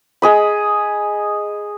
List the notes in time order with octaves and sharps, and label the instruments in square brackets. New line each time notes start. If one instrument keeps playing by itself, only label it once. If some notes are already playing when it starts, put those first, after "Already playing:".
[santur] G#4 D#5 B5